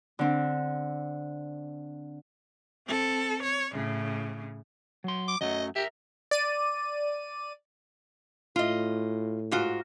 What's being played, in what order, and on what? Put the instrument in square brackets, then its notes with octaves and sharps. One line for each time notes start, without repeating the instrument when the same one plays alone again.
[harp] D3 C4
[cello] C4 A4
C#5
A2 C#3
[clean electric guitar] F#3 C6
[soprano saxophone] D6
[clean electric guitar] F#2 F#3 A3 [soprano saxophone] D#5
[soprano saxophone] G4 [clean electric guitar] A#4 E5
[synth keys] D5 D#7
[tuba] A2 [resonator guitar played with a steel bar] F4 D#5
[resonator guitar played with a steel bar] G#2 F4 F#4